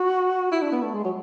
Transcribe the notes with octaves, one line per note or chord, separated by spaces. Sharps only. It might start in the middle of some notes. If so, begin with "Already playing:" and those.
Already playing: F#4
E4
D4
B3
A3
G#3
F#3